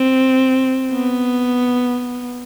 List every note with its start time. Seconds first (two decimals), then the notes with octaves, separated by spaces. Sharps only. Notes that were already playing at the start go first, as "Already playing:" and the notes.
Already playing: C4
0.92 B3